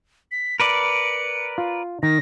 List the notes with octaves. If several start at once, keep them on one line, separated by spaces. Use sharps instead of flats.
B6
A#4 B4 D5 C#7
F4
D#3 A#6